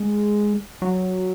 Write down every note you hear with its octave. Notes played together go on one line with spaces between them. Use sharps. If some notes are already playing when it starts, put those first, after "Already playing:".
Already playing: G#3
F#3